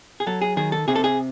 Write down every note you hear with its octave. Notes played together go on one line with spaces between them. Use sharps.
G#4
F#3 A4
G#4
D#3 G#4
A4
C3 G#4
A4
G#4